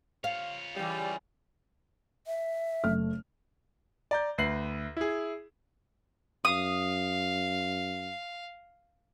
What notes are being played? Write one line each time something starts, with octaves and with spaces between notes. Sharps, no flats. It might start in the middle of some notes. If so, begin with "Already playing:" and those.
F4 C#5 F5
C#3 E3 G3
E5
F#1 A3 F6
D5 A#5 G6
D2 B4 C7 F#7
E4 G#4
F#2 F5 D#6